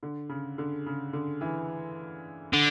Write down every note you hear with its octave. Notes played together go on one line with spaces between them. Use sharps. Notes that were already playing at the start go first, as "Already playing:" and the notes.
D3
C#3
D3
C#3
D3
E3
D3